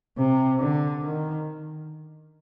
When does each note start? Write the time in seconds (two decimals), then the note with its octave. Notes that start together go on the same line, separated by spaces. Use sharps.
0.18 C3
0.60 D3
1.03 D#3